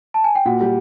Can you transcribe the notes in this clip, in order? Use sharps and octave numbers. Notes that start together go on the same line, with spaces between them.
A5
G#5
G5
A#2 F#4 F#5
G3